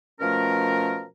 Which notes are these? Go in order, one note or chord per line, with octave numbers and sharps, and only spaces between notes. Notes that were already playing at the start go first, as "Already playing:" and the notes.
B2 F3 A3 C#4 A#4